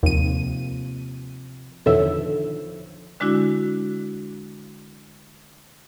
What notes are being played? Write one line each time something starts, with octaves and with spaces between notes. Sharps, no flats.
D#2 C3 F3 A#3 D#7
E2 B2 D3 D#3 F3 A4 C#5 E5
D3 G#3 D4 E4 F#4